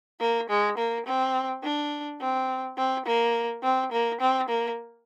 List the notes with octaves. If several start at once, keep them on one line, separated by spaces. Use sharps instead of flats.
A#3
G#3
A#3
C4
D4
C4
C4
A#3
C4
A#3
C4
A#3